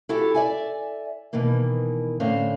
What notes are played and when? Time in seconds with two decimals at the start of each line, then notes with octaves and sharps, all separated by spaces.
0.09 E4 F#4 G4 A4
0.34 D5 E5 G#5
1.33 B2 D#3 E3 A#3
2.20 A2 D3 C4 C#4 F5